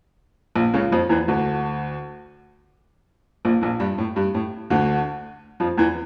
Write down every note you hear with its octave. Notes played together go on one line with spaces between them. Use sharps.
A#1 A#2
C#2 C#3
F2 F3
E2 E3
D2 D3
A#1 A#2
A#1 A#2
G2 G3
A2
G2
A2
D2 D3
F2 F3
E2 E3